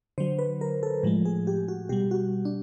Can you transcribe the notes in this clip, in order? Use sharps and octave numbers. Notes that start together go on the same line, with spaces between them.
D3 F#3 C5
B4
A#4
A4
A2 F3 G#3
G#4
G4
F#4
B2 G3 G4
F#4
D4